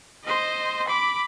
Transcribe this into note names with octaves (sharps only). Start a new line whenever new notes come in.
C5 D#5
B5 D6